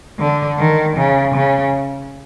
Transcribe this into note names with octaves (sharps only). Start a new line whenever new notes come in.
D3
D#3
C#3
C#3